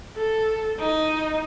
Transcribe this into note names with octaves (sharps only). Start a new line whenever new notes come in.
A4
D#4